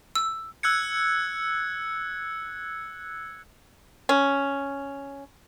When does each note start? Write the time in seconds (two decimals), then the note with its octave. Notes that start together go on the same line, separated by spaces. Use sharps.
0.15 E6
0.63 E6 F#6 G#6 C#7
4.09 C#4